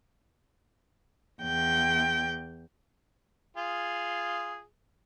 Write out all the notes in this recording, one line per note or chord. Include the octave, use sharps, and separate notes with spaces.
E2 G5
F4 G#4